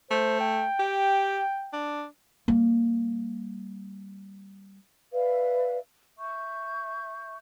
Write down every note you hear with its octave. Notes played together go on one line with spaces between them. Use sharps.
A3 C5
G5
G4
D4
G3 A#3
B4 D5 E5 F5
E5 C#6 G6